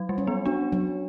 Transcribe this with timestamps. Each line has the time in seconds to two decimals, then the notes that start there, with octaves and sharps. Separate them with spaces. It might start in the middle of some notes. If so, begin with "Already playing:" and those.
Already playing: F#3
0.09 G3
0.18 C#4
0.27 B3
0.45 D4 F#4
0.72 F#3